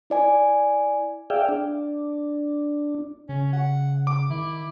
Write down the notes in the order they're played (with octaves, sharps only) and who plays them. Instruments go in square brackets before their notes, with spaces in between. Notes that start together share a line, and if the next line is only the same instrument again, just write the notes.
[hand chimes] E4 D5 G#5
[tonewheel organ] G#4 D5 E5 F5 G5
D4
[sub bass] C#3 [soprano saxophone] C#4
[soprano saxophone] F#5
[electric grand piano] D6
[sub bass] D#3 [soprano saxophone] E4